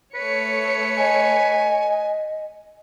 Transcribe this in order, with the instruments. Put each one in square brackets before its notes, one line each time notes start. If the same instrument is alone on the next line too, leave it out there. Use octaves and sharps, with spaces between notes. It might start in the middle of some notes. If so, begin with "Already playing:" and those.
[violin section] A3 C#5 C#7 [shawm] B4
[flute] D#5 [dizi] G#5